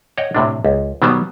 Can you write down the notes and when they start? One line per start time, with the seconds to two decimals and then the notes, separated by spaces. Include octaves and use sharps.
0.18 C#5 D#5 F#5 G5
0.35 A2 C3 D4
0.65 C#2
1.02 B2 D#3 F#3 G3 B3